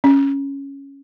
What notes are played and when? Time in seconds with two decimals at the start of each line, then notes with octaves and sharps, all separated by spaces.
0.04 C#4